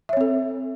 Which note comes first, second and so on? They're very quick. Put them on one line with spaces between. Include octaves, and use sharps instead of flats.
E5 C#5 C4 A4